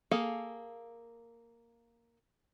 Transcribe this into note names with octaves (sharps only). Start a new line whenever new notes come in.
A#3 G#4 A4 F5